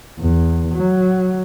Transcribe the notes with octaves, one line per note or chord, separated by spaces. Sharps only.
E2
F#3